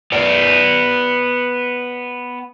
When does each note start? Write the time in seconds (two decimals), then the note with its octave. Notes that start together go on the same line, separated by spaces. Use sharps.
0.12 B3 D5